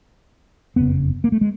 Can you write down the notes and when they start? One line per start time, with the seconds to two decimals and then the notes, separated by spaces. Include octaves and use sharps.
0.76 F#1 F2 C#3 B3
1.24 A#3
1.32 A3
1.41 G#3